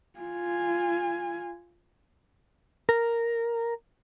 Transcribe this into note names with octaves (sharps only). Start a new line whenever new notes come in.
F4 G#5
A#4